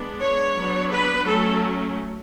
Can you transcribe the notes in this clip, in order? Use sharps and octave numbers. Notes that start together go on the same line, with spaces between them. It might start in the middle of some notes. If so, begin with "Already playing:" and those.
Already playing: G#3 B3 D4
C#5
F#3 B3 D4
B4
F#3 A3 C#4 A4